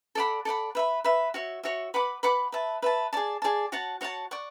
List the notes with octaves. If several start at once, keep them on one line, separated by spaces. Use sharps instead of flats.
A4 D5 F#5 B5
A4 D5 F#5 B5
B4 E5 B5
B4 E5 B5
F#4 C#5 E5
F#4 C#5 E5
B4 F#5 B5 D6
B4 F#5 B5 D6
B4 E5 A5
B4 E5 A5
G#4 D5 A5
G#4 D5 A5
F#4 C#5 F#5 A5
F#4 C#5 F#5 A5
D5 F#5 C#6